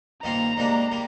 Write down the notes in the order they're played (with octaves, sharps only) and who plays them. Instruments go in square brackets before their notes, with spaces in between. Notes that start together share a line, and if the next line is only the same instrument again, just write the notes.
[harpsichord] G2 D#3 A#3 F4 C5 [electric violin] A#5
[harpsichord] G#2 G3 A#3 D4
G3 A#3